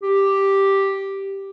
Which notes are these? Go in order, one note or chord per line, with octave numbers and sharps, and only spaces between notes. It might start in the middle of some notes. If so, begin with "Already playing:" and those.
G4